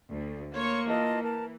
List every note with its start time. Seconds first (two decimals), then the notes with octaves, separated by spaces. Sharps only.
0.12 D2
0.54 A#3 C#5 C6 C#6
0.88 E3 F4 D#5 A5
1.23 A#4 A5